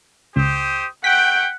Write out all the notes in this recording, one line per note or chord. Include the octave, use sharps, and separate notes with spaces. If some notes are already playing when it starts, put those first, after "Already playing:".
C#2 G4 C5 D#6
A3 F#5 G5 B6